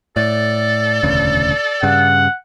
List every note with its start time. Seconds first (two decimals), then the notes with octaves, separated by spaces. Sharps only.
0.16 A2 A4 D5
1.03 E1 D2 C#3
1.83 G2 C#3 F#5